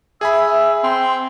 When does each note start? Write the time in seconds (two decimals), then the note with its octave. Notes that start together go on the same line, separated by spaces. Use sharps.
0.21 G#4 E5 G#5 B5 E6
0.83 C4 C6